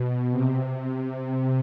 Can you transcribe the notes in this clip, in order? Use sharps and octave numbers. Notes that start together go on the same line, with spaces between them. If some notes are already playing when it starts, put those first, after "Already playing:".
Already playing: B2
C3
C3